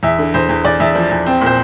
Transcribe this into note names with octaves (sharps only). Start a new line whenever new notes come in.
E2 E5
D3
E2 C5
E2
E2 D5
E2 E5
F3
E2
C4
A#2
C5